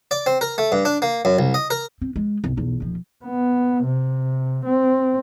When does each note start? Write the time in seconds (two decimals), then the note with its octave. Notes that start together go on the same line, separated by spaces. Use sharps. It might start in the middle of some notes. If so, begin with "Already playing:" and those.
0.11 D5
0.26 C4
0.41 A#4
0.58 A3
0.72 G2
0.85 D4
1.02 A#3
1.25 F#2
1.39 C2
1.54 D#5
1.70 A#4
2.01 C4
2.16 G#3
2.44 C2
2.57 B1 E2
2.80 D#1 F3
3.25 B3
3.85 C3
4.66 C4